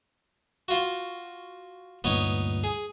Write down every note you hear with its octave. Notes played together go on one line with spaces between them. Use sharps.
F4 F#4
D2 G2 A#2 B3 D#4 C#5
G#4